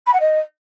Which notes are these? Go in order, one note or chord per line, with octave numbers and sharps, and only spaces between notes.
B5
F#5
D#5